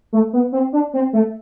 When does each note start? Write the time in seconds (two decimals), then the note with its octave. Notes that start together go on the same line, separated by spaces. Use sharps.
0.13 A3
0.33 B3
0.52 C4
0.73 D4
0.94 C4
1.13 A3